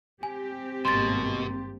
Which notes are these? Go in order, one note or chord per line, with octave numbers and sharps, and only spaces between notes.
C4 G4 G#5
G#1 G2 B2 A#3 C6 A6